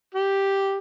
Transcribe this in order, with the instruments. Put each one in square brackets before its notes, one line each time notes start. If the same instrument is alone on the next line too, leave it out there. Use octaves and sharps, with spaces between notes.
[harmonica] G4